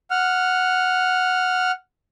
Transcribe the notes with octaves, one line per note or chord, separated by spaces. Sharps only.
F#5 F6